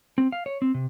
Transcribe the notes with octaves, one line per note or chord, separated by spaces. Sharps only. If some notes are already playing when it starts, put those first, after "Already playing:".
C4
F5
C#5
C4
C3